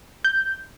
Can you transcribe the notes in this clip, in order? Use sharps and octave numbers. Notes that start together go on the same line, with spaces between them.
G6